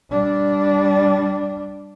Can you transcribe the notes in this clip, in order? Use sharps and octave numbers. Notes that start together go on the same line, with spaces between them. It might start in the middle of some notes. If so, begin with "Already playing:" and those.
G3 D4